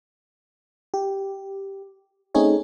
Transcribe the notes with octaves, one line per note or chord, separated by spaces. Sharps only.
G4
A3 C4 C#4 D#4 G#4 C#5